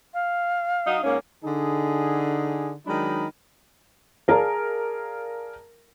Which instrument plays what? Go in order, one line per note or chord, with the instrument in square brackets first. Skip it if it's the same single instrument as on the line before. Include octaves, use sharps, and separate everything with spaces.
[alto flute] F5
[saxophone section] F#3 D#4
G#2 A#3 C#4
[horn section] D3 D#4 G#4
D#3 F#3 G#3 D4 D#4 B5
[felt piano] G#4 A#4 D5 F5 A5 A#5